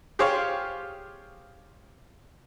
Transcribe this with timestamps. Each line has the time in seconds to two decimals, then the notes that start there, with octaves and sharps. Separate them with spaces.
0.19 F4 G4 G#4 C5 C#5 F5